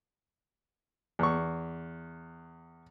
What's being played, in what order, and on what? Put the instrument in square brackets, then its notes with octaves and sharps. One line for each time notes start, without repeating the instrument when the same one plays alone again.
[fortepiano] E2 C#6